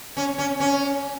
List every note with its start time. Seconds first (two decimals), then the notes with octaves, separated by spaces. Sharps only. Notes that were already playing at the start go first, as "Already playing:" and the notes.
0.17 C#4
0.38 C#4
0.60 C#4